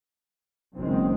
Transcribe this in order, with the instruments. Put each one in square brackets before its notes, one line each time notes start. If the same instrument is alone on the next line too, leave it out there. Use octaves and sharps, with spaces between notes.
[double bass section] F#1 F#2 D#3 G#3 C4